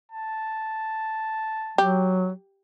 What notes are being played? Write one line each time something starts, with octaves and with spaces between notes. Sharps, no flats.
A5
F#3 G4